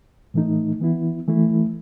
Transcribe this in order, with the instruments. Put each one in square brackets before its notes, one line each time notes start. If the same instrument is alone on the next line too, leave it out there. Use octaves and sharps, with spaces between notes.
[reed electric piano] A2 E3 A3 D#4
E3 B3 E4
E3 A3 E4